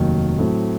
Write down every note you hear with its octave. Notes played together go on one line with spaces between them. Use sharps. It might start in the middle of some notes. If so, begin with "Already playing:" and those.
Already playing: F1 D#2 D#3 F#3
A2 F#3 A3 C4